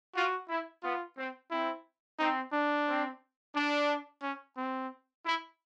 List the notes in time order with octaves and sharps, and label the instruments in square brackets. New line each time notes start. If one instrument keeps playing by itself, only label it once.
[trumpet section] F4 [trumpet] F#4
[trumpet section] E4
[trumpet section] B3 [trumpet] F4
[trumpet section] C4
[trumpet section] C4 [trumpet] E4
[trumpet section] C4 [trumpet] D#4
[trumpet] D4
[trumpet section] C4
D4
[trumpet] C#4
C4
[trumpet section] E4